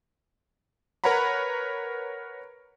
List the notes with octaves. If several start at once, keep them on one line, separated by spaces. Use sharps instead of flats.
A#4 B4 C#5 F#5 A#5 B5